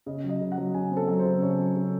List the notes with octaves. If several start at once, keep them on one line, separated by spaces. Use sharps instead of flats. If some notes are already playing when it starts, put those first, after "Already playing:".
C#3 D#5
F#3
D#5
C#3
F#5
F#3
C#3 G#5
C4
A4
F#3
C5
C#3
C#3 C#5
F#3
C#3